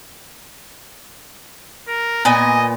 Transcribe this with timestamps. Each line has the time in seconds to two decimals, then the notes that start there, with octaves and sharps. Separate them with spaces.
1.88 A#4
2.25 A#2 B3 D#5 G#5